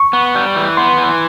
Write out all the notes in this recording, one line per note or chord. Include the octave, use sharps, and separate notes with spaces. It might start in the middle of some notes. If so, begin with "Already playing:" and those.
Already playing: C#6
B3
G3
E3
B3 C6
E3